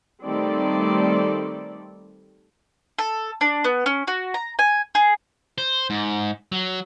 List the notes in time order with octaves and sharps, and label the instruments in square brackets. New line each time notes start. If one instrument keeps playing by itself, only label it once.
[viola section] D#3 G3 A3 C4 A4 D5
[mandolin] A4
D4
B3
C#4
F#4
A#5
G#5
G#4
[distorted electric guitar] C5
G#2
F#3